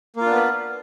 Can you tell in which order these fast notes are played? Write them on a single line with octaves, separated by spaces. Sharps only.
A#3 F4 D4 B3 B4